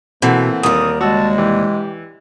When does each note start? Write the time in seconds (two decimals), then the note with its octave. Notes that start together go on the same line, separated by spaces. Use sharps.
0.22 B2 E3 A3 A#3 C4
0.63 D#2 G3 A#4 D#6
1.01 G#3 F#4 A5 E6
1.38 E3 G4